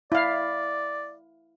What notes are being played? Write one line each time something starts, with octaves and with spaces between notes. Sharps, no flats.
E4 D5 F5